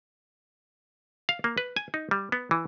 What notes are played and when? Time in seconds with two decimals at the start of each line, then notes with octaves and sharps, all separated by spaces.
1.29 F5
1.44 A#3
1.58 B4
1.76 G#5
1.94 D#4
2.11 G3
2.32 B3
2.51 E3